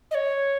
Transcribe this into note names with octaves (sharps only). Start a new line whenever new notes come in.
D#5
C#5